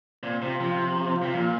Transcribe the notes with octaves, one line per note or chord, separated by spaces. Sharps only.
A#2 C4
C3 F4
C3 F3
F3
C4
F4
C3
A#2 F3